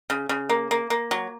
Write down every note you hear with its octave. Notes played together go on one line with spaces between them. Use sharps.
C#3
C#3
A#3
A#3
A#3
F#3